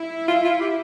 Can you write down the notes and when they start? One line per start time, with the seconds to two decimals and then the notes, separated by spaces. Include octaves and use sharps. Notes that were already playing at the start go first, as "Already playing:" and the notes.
Already playing: E4
0.28 F4
0.44 F4
0.61 G4